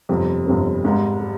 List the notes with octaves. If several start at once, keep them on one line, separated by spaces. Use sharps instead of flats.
G1 F2 C3 G3 C4
G1 F2 C3 G3 C4
G#1 G#2 G3
G3